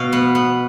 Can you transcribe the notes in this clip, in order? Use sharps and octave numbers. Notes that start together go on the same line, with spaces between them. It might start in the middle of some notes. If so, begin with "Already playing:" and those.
Already playing: B2 F5
B3
B3